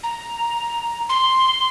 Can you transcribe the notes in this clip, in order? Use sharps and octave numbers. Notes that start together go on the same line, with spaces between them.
A#5
C6